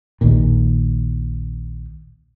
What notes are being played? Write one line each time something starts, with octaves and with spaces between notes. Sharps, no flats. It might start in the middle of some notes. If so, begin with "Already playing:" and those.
A#1 D#2 A#2